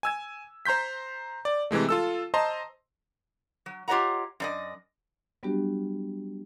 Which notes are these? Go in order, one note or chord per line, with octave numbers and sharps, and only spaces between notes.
G#5 E6 G#6
C5 A#5 C6 G6 B6
D5
C3 E3 G#3 A3
F4 A4 E6
C5 D#5 A5 A#5 C6
F#3
F4 G4 C#5 D#5 F#5 A#5
F#2 D5 D#5
F#3 G3 B3 D4 F#4 G4